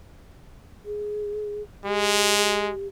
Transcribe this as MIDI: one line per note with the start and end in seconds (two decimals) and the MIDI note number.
0.85 1.62 68
1.85 2.72 56
1.85 2.88 67